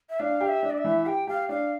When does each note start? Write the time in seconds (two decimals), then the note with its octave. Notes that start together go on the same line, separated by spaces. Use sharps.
0.09 E5
0.19 D4 F5
0.41 G4
0.48 E5
0.63 D4
0.70 D5
0.78 E5
0.84 E3
1.06 G4 G5
1.27 G4 F5
1.49 D4 F5